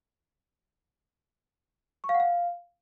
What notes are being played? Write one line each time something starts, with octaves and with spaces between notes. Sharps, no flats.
C#6
F5
F#5
F5